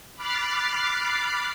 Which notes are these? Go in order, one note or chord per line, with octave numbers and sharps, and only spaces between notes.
B5 D6 F6 F#6 A6 C7